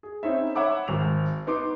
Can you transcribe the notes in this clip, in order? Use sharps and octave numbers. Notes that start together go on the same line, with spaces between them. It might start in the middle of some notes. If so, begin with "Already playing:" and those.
G#4
C4 C#4 D#4 E4 E5
C#5 E5 F#5 B5 D6 E6
G#1 F7
B3 D#4 C6 D6